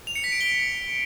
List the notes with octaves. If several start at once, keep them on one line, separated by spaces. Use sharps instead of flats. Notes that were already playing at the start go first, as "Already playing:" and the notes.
F7
C#7
B6
D7
G7